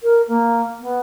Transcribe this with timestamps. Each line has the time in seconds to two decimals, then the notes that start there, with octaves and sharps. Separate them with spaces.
0.03 A#4
0.28 A#3
0.80 B3